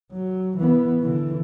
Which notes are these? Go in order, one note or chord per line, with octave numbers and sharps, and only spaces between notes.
F#3
E3 B3
D3 E3